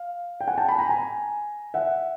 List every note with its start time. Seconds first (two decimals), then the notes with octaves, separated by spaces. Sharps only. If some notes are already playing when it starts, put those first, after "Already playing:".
Already playing: F5
0.41 G5
0.48 F#5 G#5
0.58 G5 A5
0.69 A5 B5
0.79 G#5 A#5
0.89 G#5 A#5
1.74 E5 F#5